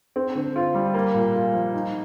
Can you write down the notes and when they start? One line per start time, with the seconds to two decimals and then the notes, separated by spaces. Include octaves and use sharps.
0.16 C4
0.35 D3
0.56 F4
0.74 G3
0.94 A#3
1.14 A#2
1.35 F4
1.53 F3
1.74 D#4